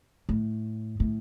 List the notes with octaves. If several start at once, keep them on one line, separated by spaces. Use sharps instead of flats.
A2
A2